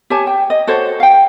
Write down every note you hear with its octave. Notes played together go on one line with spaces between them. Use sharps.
G4 C#5 G#5 A5
G5
D#5
F#4 A4 C5 C#5
F5 G5